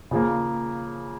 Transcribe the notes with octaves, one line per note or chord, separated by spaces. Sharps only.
C#3 F3 A#3